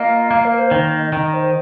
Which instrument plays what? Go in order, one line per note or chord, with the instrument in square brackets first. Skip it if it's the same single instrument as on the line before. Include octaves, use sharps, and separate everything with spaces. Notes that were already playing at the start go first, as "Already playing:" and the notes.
Already playing: [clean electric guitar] A#3 F4 [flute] D#5
[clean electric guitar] A#3 [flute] F5
[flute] A#4
C5
[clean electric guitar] D#3 [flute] D#5
[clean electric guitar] D#3 [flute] D#5
[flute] C5